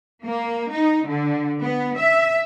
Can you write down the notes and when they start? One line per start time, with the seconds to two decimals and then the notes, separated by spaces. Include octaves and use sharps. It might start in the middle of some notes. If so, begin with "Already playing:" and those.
0.23 A#3
0.72 D#4
1.07 D3
1.61 B3
1.98 E5